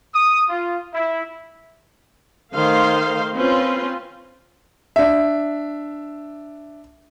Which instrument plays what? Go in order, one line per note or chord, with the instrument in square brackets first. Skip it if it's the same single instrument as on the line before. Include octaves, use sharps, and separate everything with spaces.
[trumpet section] D#6
F4
E4
[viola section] D#3 A3 C5 F5 C6
C4 C#4 F4 B4 C6
[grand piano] D4 E5